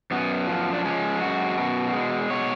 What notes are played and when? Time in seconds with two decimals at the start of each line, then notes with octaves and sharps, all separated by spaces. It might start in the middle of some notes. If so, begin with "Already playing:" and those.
0.11 F#2 B3
0.47 F3
0.73 D4
0.85 G#3 C#4
1.21 F#2 F#4
1.57 B2
1.93 G#3
2.30 B2 C#5